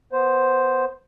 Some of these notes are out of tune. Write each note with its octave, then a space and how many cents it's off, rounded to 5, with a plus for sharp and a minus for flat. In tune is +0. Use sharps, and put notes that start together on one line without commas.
B3 +0 C5 +0